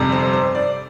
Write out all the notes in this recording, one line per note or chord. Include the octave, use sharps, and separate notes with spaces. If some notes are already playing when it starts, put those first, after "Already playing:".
Already playing: G1 F2 C3 G3
C5
C5
D5